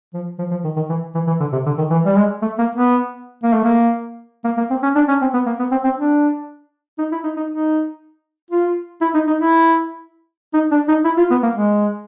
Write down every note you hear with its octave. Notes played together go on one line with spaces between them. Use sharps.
F3
F3
F3
D#3
D#3
E3
E3
E3
D3
C3
D3
D#3
E3
G3
G#3
A3
A#3
B3
A#3
A3
A#3
A#3
A#3
C4
C#4
D4
C#4
C4
B3
A#3
B3
C4
C4
D4
D#4
E4
D#4
D#4
D#4
F4
E4
D#4
D#4
E4
D#4
D4
D#4
E4
F4
B3
A#3
G#3